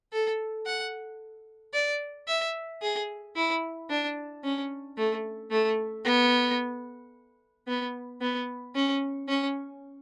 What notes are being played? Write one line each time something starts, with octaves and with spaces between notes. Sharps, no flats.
A4
F#5
D5
E5
G#4
E4
D4
C#4
A3
A3
B3
B3
B3
C#4
C#4